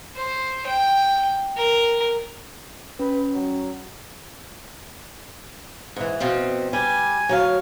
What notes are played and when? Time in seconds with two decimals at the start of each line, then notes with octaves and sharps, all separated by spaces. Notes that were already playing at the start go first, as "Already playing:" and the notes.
0.16 C5
0.66 G5
1.57 A#4
2.99 C#4 B4
3.33 F#3
5.96 G#2 E3
6.20 B2 F3 C4
6.73 G3 G#5
7.29 F#3 C#5 F5